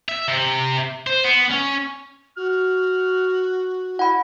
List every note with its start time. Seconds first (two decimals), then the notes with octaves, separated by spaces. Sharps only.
0.09 E5
0.28 C3
1.07 C5
1.24 B3
1.51 C#4
2.37 F#4 F6
3.99 E4 F#5 B5